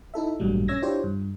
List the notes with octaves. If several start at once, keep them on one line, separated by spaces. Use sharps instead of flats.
D#4 E4 A4 E5
A1 G2 A#2 F#3 G3 A3
C#4 C#5 E6 G#6 A#6
D4 E4 F4 G4 C5 C#5
G2